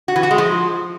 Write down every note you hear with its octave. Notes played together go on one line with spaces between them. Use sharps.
F#4
E3
F#4
G#3
F3